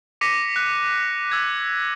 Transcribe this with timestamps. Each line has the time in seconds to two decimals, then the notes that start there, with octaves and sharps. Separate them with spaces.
0.21 D6 A#6 B6 C#7 D#7
0.56 F#6
1.32 E6 G#6